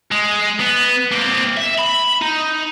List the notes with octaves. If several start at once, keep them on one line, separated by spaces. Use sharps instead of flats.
G#3
B3
A#3 C4
E5
B5
D#4